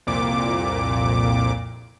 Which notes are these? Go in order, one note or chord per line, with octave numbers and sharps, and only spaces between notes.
C2 F2 A#2 D6